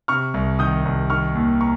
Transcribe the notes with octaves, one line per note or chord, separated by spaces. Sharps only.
C3 C#6 F6
C2
D#3 D#6 G6
C2
D#3 C#6 F6
D#2
A#5 C#6